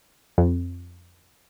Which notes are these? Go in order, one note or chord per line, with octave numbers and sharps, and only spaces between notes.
F2